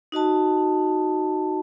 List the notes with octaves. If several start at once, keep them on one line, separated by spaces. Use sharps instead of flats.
D#4 F#4 D#5 A5